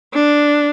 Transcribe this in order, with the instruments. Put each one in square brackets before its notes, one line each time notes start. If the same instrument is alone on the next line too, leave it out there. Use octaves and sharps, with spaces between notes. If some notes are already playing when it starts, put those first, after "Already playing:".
[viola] D4